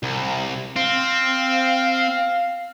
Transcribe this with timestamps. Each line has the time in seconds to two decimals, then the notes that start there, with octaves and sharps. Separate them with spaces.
0.03 C2
0.76 C4 F5